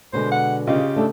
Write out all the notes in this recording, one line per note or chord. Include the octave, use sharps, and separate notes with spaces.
B2 D3 G#3 C5
F#5
C#3 F4 G4 D#5
A3 D4 A4